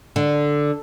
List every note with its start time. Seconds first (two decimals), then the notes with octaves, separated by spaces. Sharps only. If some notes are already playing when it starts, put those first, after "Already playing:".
0.16 D3